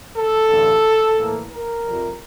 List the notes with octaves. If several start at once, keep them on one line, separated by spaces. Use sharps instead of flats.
A4
A1 G2 D3
A2 E3 A#3
A#4
F2 C3 G3